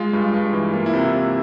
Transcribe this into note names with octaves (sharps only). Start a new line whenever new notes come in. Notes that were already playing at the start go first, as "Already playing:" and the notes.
Already playing: G#3 F4
G2
G2
E3
A#3 F4
E4
C3
E4
C3